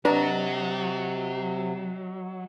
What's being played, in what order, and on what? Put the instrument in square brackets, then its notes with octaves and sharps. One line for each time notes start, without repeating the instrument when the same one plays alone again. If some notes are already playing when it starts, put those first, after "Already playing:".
[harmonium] C3 [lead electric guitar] F#3 [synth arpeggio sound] D4 B4 [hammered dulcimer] D#5 A5 A#5